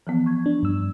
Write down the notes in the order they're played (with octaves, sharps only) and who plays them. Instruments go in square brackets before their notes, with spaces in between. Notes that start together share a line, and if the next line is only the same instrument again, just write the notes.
[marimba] E3 F3 B3
C#6 G#6
[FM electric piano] D4
G2 E6